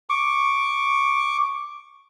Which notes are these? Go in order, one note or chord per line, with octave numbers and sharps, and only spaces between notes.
C#6 D6